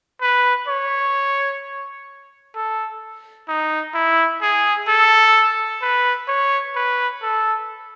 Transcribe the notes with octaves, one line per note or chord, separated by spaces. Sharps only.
B4
C#5
A4
D#4
E4
G#4
A4
B4
C#5
B4
A4